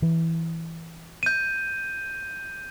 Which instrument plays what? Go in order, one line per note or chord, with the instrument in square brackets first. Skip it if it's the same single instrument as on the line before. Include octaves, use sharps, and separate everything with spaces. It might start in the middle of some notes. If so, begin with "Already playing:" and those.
[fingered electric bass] E3
[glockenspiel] G6 D#7